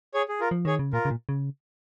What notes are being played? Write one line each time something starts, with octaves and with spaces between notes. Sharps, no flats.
G#4 C#5
G#4
F4 A#4
F3
D#3 G#4 C#5
C#3
A#2 F4 A#4
C#3
A#2
C#3